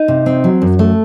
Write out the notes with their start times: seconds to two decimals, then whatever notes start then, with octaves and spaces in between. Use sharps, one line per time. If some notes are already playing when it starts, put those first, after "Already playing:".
Already playing: D#4
0.08 C3
0.26 C4
0.44 F#3
0.62 F#2
0.79 A3